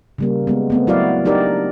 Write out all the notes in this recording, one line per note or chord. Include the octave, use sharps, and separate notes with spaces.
C#3 G3 A#3
G#3 B3
A3 B3 C4
F#3 E4 F#4 A#4 D5 F5
D4 D#4 G4 A#4 D5